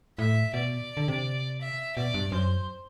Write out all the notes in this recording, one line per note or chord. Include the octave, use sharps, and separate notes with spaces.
A2 E5
B2 D5
D3
C3
E5
B2 D5
G2
F#2 C5